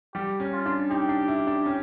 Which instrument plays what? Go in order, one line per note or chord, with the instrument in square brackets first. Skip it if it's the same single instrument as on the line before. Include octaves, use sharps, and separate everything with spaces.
[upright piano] G3 [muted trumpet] G4
[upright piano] C#4
[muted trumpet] F4
[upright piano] D4
[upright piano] D#4 [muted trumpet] G4
[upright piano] D4
E4
D4
C#4